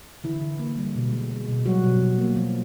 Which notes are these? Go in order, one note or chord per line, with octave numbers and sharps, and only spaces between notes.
D3 E3 E4
D3
A#3
G3
B2
G#3
G#3
B2
F#3 G3 F#4
B2
B2
A#3
F3